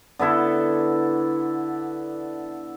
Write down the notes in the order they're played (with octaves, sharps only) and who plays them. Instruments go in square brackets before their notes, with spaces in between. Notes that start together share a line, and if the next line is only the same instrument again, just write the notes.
[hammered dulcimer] D3 B3 E4 A4